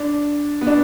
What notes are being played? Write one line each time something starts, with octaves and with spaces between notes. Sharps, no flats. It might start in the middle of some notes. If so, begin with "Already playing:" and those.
Already playing: D4
B3
D4